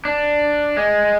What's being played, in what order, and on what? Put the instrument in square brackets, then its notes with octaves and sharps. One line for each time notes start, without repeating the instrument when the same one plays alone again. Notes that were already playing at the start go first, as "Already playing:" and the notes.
[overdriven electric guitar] D4
G#3